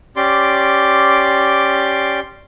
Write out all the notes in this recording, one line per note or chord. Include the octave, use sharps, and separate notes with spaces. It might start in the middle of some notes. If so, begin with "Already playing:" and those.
C#4 G4 D5 C6 D6